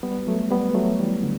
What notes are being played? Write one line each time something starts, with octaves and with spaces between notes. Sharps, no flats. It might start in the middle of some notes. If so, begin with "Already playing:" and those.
G3 B3
F#3 A3
G3 B3
F#3 A3
E3 G3
D3